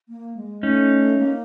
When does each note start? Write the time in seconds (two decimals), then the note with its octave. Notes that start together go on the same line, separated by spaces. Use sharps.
0.09 A#3
0.37 G#3
0.63 A3 C#4 D#4
1.19 A#3